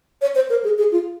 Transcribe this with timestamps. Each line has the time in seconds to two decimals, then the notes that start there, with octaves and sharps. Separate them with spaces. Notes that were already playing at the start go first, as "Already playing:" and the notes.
0.22 C#5
0.35 C5
0.50 A#4
0.64 G#4
0.78 G#4
0.92 F4